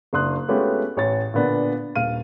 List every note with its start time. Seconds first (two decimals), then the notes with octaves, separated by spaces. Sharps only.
0.13 F#1 D4 C6 D#6 F#6
0.48 G#3 A3 B3 C#4 F4 G4
0.97 A1 C#5 A6
1.34 A#2 D3 B3 D4
1.96 D#1 F5 F6 D#7